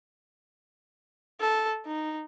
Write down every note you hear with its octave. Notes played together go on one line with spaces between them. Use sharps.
A4
D#4